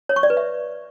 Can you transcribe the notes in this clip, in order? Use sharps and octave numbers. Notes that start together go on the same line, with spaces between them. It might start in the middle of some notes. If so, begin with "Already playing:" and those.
C#5
C#6
D5
B4
E5